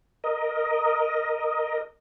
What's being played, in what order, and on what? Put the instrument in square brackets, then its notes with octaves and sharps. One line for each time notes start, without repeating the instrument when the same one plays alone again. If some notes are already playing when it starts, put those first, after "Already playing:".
[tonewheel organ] A#4 D#5